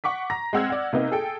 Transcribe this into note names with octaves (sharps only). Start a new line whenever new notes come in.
F#5 C#6 D6 B6
A#5 A#6
G#3 C4 F#5 E6 F6 G#6
D5 F#5
C3 A#3 B3 D#4
G#4 A4 G5